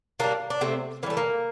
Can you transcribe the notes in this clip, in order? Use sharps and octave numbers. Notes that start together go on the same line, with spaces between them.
E3 G3 A#3 D4
D4
C3 A3 C4
E3 G3 A3 A#3
A#3